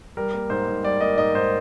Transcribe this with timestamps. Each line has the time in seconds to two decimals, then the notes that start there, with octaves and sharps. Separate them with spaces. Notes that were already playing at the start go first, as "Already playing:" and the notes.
0.17 G3 A#4
0.34 A#3
0.50 G#2 C5
0.68 G#2
0.83 G3 D5
1.01 A#3 D#5
1.18 G#2 D#5
1.34 G#2 C5